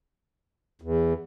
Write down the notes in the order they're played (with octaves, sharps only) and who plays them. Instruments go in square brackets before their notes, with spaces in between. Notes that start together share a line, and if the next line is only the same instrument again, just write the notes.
[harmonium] E2